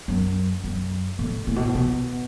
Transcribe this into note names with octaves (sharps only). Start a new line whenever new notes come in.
F#2
F#2
A2
A2
B2
A2
B2